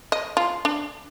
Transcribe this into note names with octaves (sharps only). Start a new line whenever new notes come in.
D#5
F4
D4